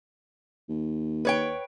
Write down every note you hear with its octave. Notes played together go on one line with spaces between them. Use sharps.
D#2
B4 C#5 G5